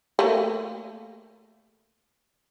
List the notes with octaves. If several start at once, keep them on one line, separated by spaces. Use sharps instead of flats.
A3 A#3